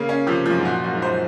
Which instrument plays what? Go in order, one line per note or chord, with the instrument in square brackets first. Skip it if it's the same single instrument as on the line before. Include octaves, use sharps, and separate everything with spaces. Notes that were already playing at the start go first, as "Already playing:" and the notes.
Already playing: [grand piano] C#3 [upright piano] A#3
[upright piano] C#4
[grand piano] C3 [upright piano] F3
[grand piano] F#2 [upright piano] F3
[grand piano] G#2
[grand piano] A#2 [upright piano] F#4
[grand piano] F#2 [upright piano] F#4
[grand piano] G#2
[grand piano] F#2 [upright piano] C5